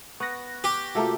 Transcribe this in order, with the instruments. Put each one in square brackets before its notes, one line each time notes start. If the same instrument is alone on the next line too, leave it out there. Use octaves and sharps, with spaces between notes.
[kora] B3 [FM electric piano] C#6 F#6 A#6
[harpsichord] G4
[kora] C3 A3 A#3 [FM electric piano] F4 F#4